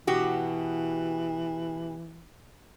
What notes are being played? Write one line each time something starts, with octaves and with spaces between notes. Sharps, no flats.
B2 E3 F#4 G4